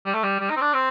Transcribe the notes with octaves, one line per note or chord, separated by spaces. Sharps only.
G3
A3
G3
G3
D#4
C4
D4
C4